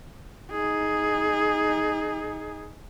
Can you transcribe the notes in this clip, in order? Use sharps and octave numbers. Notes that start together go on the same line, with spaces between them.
D#4 G#4